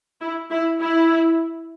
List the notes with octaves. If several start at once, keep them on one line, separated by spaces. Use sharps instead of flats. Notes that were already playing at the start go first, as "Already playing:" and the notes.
E4
E4
E4